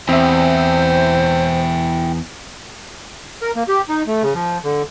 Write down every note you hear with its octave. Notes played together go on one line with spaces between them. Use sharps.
E2 C4 E4 G4 C5 E5
A#4
A#3
G4
D#4
A3
C#3
F3
D3